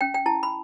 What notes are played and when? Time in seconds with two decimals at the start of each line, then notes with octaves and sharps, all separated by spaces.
0.01 C#4 G5
0.14 G5
0.26 E4 A5
0.43 B5